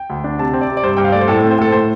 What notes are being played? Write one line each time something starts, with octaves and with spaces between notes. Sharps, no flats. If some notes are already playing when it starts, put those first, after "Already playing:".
Already playing: G5
D2
D4
C3 A5
C4
D5
C3
D5
G2 C5
G2 G5
F5
A3 D5
C5
A2 A4
C4 A4
C5
A2 A4
A2 C5